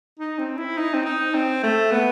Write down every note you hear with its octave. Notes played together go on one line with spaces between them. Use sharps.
D#4
C4
E4
D#4
C4
D#4
C4
A3
B3